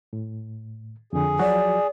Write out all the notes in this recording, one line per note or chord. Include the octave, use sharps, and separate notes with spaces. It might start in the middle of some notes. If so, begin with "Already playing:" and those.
A2
F2 D3 G#4
F3 F#3 F#4 D5